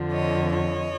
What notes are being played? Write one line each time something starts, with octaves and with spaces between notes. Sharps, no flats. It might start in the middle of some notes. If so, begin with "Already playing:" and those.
Already playing: F2 D3 F3
C#5 D#5
C#5 D#5